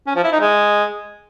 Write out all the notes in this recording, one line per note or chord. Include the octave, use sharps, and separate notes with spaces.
C#4
F3
E4
D#4
G#3